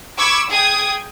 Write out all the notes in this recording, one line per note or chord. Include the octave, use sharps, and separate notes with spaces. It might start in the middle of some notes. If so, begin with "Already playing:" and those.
B5 C#6 D6 E6 G#6
G#4 G5 D#6 G#6